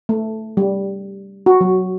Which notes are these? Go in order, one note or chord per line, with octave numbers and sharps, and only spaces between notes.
A3
G3
F#4
F#3